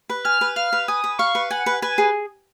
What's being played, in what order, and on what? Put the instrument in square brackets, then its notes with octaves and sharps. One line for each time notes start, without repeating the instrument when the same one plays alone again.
[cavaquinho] B4
[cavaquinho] G#5 [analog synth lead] F6
[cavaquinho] B4
[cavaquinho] F5 [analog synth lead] F6
[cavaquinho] B4
[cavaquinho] G#5 [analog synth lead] D#6
[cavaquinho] B4
[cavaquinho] F5 [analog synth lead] C#6
[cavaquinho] B4
[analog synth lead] F#5 [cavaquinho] G#5
[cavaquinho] B4
[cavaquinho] B4 [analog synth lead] G#5
[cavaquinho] G#4